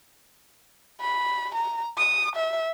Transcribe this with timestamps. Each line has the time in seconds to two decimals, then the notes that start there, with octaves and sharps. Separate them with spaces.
1.01 B5
1.55 A#5
1.98 D#6
2.36 E5